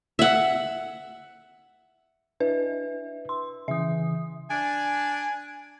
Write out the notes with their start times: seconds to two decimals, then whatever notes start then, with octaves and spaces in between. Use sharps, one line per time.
0.19 E5 F#5
2.40 D4 E4 B4 E5
3.29 C6
3.68 C#3 E3 E5 D#6
4.50 D4 G#5